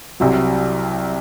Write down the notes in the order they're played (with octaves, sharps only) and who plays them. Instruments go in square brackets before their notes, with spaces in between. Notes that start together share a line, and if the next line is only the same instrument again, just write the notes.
[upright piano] C2 C3 F#3